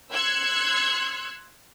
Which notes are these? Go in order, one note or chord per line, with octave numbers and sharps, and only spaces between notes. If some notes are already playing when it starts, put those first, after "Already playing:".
C6 E6 F#6 G#6 C#7